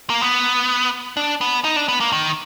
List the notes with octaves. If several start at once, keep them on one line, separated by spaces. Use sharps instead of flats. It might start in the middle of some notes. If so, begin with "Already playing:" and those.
A#3
B3
D4
B3
D#4
D4
B3
A#3
D#3